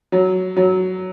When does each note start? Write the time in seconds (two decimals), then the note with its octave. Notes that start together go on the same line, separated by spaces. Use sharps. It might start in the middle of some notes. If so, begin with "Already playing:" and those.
0.12 F#3
0.57 F#3